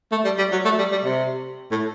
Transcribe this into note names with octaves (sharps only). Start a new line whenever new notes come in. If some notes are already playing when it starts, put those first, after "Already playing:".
A3
G3
G3
F#3
A3
G3
G3
C3
A2